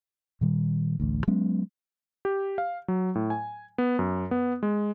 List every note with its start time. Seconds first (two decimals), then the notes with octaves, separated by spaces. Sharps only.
0.41 A#2 D#3 G3
1.00 A1 D2
1.27 F#3 G#3 B3 C#4
2.25 G4
2.58 F5
2.88 F#3
3.15 A2
3.30 G#5
3.78 B3
3.99 F#2
4.31 B3
4.63 G#3